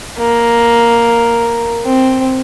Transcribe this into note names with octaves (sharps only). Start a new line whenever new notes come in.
A#3
C4